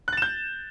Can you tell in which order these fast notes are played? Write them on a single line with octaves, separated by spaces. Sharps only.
F#6 A6 E7 G6